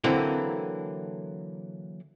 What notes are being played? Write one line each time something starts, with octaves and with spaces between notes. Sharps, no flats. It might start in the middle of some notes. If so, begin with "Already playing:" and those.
D3 E3 F#3 A#3 C4 E4